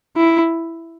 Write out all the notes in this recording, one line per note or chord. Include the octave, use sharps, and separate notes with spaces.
E4